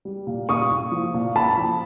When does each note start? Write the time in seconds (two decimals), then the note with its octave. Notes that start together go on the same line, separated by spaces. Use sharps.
0.05 G3
0.27 A#2
0.49 A#2 C#6 D#6
0.70 A#2
0.92 F3
1.14 A#2
1.36 A#2 A5 B5
1.57 F3